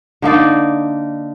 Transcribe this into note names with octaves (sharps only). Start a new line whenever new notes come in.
D3 A#3 D#4 D5